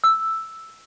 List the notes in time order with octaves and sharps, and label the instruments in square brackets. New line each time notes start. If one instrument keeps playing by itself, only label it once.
[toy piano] E6